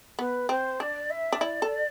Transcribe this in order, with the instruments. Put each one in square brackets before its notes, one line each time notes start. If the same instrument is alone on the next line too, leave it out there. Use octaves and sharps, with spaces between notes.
[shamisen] B3 [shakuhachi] B4
[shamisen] C4 [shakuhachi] C5
[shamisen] D4 [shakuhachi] D5
[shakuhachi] E5
[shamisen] D4
[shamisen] E4 [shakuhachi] D5
[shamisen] A4